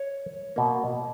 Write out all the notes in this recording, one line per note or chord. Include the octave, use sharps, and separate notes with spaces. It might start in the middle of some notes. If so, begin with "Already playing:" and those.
Already playing: C#5
B2 A#3